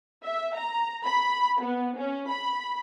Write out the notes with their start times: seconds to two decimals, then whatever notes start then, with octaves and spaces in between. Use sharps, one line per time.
0.24 E5
0.56 A#5
1.05 B5
1.62 B3
1.98 C#4
2.29 B5